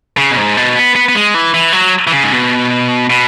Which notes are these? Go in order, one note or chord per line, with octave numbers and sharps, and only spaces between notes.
C#3
B2
G#2
B2
B3
B3
B3
G#3
E3
E3
F#3
E3
C#3
G#2
B2
B2